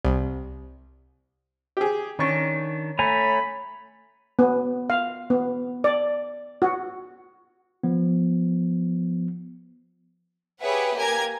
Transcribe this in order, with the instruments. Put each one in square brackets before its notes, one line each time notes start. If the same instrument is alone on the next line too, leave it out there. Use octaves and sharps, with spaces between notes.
[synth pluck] C2
[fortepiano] G4 G#4
[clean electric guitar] D#3 D4 [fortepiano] C#4 C#6
[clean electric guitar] A3 [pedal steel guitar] C#5 G#5 A#5 [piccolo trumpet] B5
[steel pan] B3
F5
B3
D5
F#4
[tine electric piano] F3 B3
[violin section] G4 G#4 B4 C#5 E5 F#5
A#3 G4 G#5 A#5 G#6